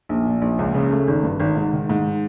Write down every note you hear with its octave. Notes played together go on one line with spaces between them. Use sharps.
A#1
A#2
A#1
C#2
C#3
A3
G#1
G2
G#1
G#2
D#3
G#2